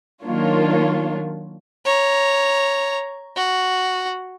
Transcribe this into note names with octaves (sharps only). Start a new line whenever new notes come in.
D#3 F#3 A#3 D4 F4 C#5
C#5 A#5
F#4